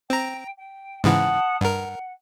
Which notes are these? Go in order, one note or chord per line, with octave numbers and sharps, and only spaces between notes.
C4 G5 A#5
G5
G#2 C#3 E3 F#5 A5 D#6
G2 A#4 F#5